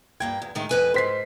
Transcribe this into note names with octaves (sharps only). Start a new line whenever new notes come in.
G2 A#3 G5 G#6
E2
A2 D#3 G#3
F2 B4 G#5
D2 G#2 C5 B6 C7